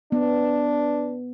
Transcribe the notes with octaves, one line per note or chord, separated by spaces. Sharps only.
B3 D4